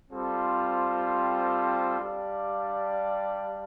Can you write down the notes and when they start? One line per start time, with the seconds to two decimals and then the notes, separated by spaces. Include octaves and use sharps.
0.10 G3 C4 F4 A4 C5
1.99 G3 D4 G4 D5 F5